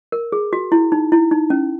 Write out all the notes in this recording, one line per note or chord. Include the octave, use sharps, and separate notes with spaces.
A#4
G#4
F#4
E4
D#4
E4
D#4
C#4